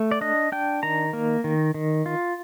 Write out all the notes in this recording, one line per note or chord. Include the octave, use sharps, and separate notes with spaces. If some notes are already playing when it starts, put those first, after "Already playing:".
Already playing: A3
D5
D4 D#5
D4 G5
D#3 A#5
A#3
D#3
D#3
F4